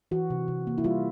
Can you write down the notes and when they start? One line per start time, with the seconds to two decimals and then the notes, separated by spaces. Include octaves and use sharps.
0.11 E3 F#4
0.30 C3
0.48 C3
0.67 A#3
0.78 E4
0.84 G3 F4